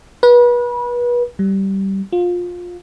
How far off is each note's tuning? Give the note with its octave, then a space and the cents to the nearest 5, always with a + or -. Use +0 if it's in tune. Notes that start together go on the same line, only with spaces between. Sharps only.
B4 -30
G3 -15
F4 +20